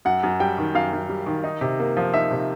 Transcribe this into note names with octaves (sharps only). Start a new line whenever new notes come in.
F#2 F#5
F#2
G3 G5
D#3
F#2 F5
F#2
G3
D#3
D#4
C3
A#3
F3
D#4 E5
C3